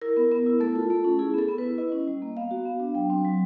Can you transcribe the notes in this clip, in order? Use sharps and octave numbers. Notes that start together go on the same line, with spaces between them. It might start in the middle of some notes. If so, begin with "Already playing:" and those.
E4 A#4
B3
B3
E4
A3 A4
F4
A3
C#4
E4 G#4
B3 A4
B3
E4 B4
E4 D#5
C#4
G3
A#3
B3 F5
F#4
B3
D4
F#3 G5
C4
F#3